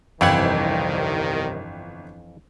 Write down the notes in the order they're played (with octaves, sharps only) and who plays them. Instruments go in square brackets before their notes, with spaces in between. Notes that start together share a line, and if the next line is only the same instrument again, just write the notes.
[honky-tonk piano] G1 G5 G#6 [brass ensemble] C2 D#3 [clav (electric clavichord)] F2 E3 F#5